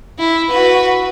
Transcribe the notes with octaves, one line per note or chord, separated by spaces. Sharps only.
E4
F#4 B4